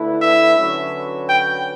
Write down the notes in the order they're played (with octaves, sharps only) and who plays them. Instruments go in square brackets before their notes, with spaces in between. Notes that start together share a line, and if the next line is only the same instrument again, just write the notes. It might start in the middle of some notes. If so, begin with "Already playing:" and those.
Already playing: [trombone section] D3 A3 E4 B4
[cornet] E5
[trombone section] D3 F#3 C#4 F#4 B4
[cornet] G5